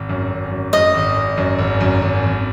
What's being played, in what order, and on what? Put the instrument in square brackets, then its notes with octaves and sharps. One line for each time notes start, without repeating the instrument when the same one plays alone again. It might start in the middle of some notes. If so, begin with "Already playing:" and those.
Already playing: [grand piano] G#1
F#2
G#1
F#2
[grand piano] F#2 [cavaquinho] D#5
[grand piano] G#1
G#1
F#2
G#1
F#2
G#1
G#1